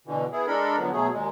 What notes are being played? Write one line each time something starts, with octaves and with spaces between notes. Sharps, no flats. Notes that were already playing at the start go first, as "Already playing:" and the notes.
B2 D3 E3
B3 E4 G#4
G#3 D4 A4 A#4 B5
D3 F3 F#3 B3
B2 F#3 A3 G#4
D#2 A#2 G#3